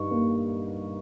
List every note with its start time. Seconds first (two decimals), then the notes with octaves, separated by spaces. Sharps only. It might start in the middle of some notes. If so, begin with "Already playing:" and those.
Already playing: G2 D#4 C#6
0.11 A#3